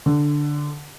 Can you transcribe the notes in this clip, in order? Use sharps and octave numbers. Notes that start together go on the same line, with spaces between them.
D3